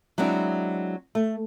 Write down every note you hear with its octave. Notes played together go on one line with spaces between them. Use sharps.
F#3 G#3 C4 D4 E4
A3